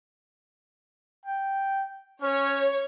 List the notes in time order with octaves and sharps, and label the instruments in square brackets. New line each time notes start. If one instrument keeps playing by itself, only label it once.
[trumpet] G5
[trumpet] C#4 [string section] C#5